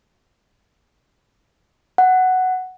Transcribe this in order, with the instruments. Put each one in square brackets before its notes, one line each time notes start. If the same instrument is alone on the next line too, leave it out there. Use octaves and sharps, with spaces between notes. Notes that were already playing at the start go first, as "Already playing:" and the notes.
[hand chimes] F#5